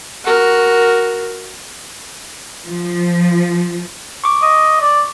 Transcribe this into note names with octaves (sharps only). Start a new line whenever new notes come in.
F#4 A#4
F3
C#6 D6
D#5
D5